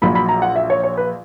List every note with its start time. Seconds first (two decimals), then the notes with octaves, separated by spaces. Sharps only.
0.02 A#1 A#2 F#3 B5
0.15 B5
0.29 A#5
0.42 F#5
0.56 E5
0.70 C#5
0.83 C#5
0.97 B4